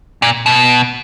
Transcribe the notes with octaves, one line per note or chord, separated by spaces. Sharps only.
A#2
B2